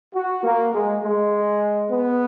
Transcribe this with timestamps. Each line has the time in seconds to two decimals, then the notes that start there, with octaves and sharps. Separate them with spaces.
0.15 F#4
0.44 A#3
0.74 G#3
1.03 G#3
1.89 B3